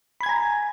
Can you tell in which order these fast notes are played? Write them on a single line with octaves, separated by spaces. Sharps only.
B5 G#6 G#5 A#5